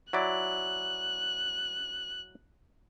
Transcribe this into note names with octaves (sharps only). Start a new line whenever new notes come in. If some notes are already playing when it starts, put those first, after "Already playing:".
F#3 E4 D5 F#6